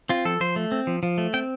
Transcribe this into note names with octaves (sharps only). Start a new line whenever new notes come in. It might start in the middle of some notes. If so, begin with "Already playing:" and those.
C4 F4
F3 A4
F3 C5
A3
C4
F3
F3
A3
C4 G5